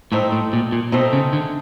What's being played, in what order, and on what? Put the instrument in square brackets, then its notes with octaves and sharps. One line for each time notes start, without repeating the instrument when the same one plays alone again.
[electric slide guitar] A2 [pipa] A3 C4 D#4
[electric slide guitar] A2
A#2
A#2
[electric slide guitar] B2 [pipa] A3 C4 D#4
[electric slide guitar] C#3
D3